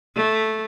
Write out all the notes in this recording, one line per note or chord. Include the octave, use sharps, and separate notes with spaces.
A3